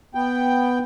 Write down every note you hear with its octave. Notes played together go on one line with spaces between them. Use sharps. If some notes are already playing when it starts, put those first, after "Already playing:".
B3 G5